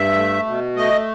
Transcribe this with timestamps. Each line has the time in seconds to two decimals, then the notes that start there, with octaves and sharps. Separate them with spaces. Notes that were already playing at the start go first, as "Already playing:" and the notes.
Already playing: G2 E5
0.17 A3
0.46 B2
0.76 A3 D#5